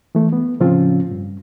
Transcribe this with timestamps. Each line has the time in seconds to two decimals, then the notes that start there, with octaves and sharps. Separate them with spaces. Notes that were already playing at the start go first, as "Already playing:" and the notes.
0.15 E3 A3
0.33 B3
0.60 A2 C#3 F3 C4 C#4 F4
1.11 G2